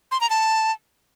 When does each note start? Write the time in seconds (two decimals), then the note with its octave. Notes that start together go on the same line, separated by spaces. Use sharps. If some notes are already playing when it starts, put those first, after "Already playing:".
0.12 C6
0.21 A#5
0.30 A5